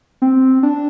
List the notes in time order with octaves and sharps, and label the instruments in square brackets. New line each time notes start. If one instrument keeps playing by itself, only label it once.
[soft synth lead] C4
D4